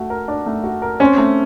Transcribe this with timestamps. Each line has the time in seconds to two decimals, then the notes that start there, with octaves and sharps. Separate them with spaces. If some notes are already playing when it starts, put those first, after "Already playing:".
Already playing: A3 F#4
0.10 A#4
0.28 D4
0.46 A3
0.64 F#4
0.82 A#4
1.00 C4 C#4
1.18 A3